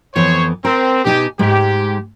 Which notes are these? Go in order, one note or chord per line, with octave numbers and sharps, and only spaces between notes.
F2 E3 B3 C5 C#5
C4 A#4
B2 D#4 G4 G#5
G#2 G#3 G4